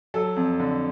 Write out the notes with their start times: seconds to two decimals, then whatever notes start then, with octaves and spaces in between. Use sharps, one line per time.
0.14 F#3 A4
0.36 F2
0.60 D3